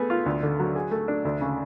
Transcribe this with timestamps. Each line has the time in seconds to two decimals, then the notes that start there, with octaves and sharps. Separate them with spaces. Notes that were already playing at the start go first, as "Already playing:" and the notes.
Already playing: A3 B3 G#4
0.10 F4
0.26 D2
0.43 D3
0.59 F#3
0.76 G#4
0.91 A3
1.08 D4
1.25 D2
1.41 C#3